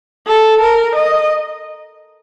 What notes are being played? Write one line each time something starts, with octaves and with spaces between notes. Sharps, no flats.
A4
A#4
D#5